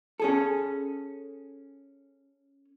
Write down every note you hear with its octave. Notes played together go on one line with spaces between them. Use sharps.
C#4 G#4 A4